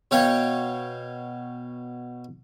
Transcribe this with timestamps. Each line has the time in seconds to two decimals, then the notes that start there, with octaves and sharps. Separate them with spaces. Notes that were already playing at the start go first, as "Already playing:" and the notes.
0.11 B2 C#5 F5 G5 G#5 C#6